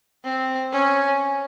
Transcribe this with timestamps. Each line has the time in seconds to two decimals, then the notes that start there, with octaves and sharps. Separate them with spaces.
0.24 C4
0.72 C#4